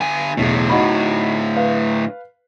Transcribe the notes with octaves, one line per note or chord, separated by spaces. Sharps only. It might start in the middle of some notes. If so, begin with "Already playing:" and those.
D3 G#5
E1 B1 A2 D3
D#4 F#4 B5
B4 F5